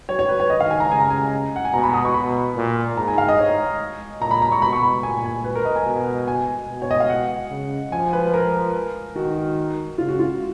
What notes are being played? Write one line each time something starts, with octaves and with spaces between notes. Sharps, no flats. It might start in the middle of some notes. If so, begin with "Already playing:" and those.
F#3 C#5
C#5
B4
C#5
D#3 D#5
F5
G#5
A#5
C#3 G#5
A#5
G#5
F#5
G#5
B2 A#5
B5
D#6
C#6
B2 B5
A#2
G#2 A#5
G#5
F5
D#5
C#5
A#2 A#5
B5
A#5
C#6
B2 B5
C#6
B5
A#2 G#5
G#5
B4
A#4
D#5
G#5
B2
G#5
B2
C#5
D#5
F5
F#5
C#3
F3 G#5
B4
A#4
D#3 F#4
C#3 F4
F#4
F4